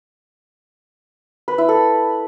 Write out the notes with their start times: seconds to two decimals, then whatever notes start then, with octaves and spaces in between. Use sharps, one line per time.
1.48 B4
1.58 E4
1.69 A4